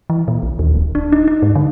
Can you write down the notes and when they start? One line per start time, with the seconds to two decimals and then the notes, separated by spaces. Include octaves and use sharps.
0.10 E3
0.28 A#2
0.43 A#1
0.59 D#2
0.75 D#1
0.95 D4
1.12 D#4
1.28 D#4
1.42 G#2
1.55 D3